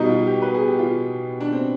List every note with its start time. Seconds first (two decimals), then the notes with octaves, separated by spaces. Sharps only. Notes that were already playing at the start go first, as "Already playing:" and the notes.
Already playing: B2 G3 D#4
0.09 F4
0.26 G4
0.42 B4
0.54 G#4
0.67 G4
0.79 F4
1.41 D4
1.53 C4